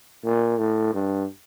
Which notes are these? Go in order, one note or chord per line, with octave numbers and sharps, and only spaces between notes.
A#2
A2
G2